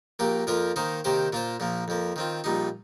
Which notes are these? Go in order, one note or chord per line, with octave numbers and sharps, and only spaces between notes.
A#1 A#2 A#3 G4
F2 F3 A#3 F4 A#4
D#3 A#3 D#4 C5
C3 D#3 A#3 G4 C5
A#2 A#3 F4 C5
A#1 A#2 F3 A#3
F2 F3 A#3
D#3 C4 F4
A#1 A#2 G3 D#4